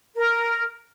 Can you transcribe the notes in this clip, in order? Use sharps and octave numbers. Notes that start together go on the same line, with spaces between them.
A#4